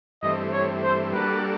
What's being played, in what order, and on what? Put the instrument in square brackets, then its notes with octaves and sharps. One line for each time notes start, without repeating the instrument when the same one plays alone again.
[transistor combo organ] G2 E3 A3 C4 [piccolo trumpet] D#5
[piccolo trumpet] C#5
C5
[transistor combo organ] G3 A#3 D4 F#4 A4 [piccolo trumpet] B4